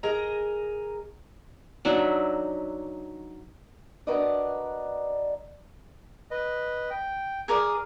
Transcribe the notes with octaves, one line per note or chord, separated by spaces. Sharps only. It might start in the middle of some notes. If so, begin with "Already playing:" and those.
G#4 A#4 D#5 A#5
F#3 D4 D#4 E5
D4 F#4 A#4 B4 D5 D#5
B4 D#5
G5
G#4 A#4 D5 D#6